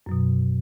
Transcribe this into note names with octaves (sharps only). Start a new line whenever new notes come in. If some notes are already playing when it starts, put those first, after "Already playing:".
F#2 B2 F#3